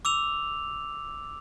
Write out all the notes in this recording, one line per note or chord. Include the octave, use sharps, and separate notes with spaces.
D6 E6 F7